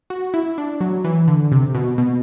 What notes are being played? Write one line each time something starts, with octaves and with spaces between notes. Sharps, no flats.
F#4
E4
D4
F#3
E3
D3
C3
B2
B2